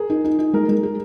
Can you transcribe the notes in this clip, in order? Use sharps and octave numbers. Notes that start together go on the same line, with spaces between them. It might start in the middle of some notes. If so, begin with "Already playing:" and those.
Already playing: G#4 A#4
D#4
D#4
D#4
G#3 A#4
G#3
G#4